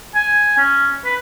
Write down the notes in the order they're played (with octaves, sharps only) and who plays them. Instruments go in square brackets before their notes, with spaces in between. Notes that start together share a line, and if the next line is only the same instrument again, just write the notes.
[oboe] G#5
C#4
B4